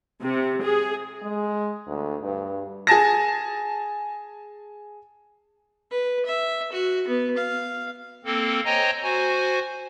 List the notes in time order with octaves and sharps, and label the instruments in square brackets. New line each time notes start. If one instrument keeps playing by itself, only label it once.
[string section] C3
G#4
[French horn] G#3
D2
G2
[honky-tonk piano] G#4 G#5 A5 A#6
[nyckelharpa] B4
E5
F#4
B3
F5
[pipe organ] A#3 C4 A4
C5 C#5 D#5 G5 G#5 A#5
F#4 C5 G#5